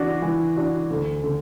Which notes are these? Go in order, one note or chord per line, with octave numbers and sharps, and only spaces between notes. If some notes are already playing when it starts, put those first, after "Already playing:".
Already playing: E3 D4 F#4
E3
D4 F#4
D2
D3